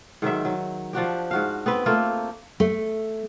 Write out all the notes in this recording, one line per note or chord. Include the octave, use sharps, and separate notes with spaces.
G#2 D#3 F#3 E5
F#3
F3 D4 F#4 G4
G#2 F#4 F5
B3 C4 B4
A3 A#3 C4 F4
A3